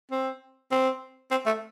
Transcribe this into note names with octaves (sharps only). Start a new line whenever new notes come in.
C4
C4
C4
A3